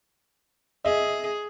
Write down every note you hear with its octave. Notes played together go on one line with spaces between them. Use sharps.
G#4 D#5 E5